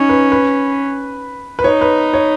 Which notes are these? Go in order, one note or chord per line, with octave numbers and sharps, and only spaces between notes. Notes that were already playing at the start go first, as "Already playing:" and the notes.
Already playing: C#4 D#4
B4
B4
B4
D#4 C#5
B4
C#5